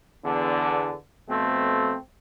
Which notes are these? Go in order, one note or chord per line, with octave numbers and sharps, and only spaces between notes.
E2 D3
F2 B2 A3 C4